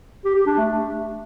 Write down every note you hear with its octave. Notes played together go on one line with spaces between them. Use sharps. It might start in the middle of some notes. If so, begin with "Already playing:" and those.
G4
G4
D4
A3